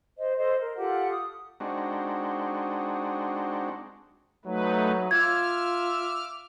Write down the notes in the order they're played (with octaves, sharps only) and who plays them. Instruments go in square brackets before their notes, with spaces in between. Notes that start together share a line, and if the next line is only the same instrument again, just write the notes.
[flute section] C5 D#5
A4 C5 D#5
A#4
F4 G4 A4 F#5
D#6
[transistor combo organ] G#3 C4 D4 D#4 F#4
[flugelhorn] F#3 [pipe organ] A3 D#4 B4
[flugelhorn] F4 [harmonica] E5 D6 E6 [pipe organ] F6 [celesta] G#6